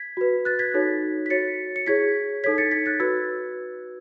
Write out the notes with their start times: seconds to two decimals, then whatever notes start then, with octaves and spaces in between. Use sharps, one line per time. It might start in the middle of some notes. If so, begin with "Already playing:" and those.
Already playing: G#6 B6
0.17 F#4 B4
0.45 F#6 A6
0.59 G#6 B6
0.74 D#4 F#4 A4 C#5
1.26 B6
1.30 F#4 C#5 A6 C#7
1.76 C#7
1.87 E4 G#4 C#5 G#6 B6
2.44 D#4 A4 C#5 G#6 B6
2.58 A6 C#7
2.71 G#6 B6
2.86 F#6 A6
3.00 F#4 B4 E6 G#6